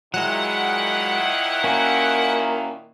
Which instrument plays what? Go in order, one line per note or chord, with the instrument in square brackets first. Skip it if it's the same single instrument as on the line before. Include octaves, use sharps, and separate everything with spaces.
[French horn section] A#2 D#3 E4 [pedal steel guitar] F#3 G#3 [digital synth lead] F#5
[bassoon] A#3 [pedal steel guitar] C#4 F#4